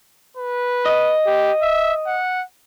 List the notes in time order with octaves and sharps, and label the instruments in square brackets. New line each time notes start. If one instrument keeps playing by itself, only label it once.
[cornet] B4
[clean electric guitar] D#5
[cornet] G4
E5
F#5